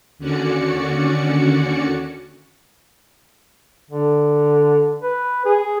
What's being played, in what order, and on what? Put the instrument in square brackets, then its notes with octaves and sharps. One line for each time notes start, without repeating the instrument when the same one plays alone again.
[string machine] D#2 D3 C#4 F#4 D5 C#7
[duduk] D3
B4
G#4